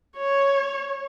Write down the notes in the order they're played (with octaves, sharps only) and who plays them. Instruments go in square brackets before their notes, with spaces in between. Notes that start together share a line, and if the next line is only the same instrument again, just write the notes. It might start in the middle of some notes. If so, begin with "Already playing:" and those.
[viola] C#5